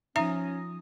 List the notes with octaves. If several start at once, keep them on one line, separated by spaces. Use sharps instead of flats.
F3 C#4 D#4 E5 A#5 D#6 A#6